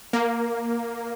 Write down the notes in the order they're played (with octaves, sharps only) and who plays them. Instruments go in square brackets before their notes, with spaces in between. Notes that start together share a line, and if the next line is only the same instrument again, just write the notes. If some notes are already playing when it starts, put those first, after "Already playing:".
[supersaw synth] A#3